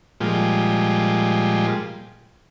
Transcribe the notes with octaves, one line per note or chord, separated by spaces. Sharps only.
A#2 F3 G3 G#3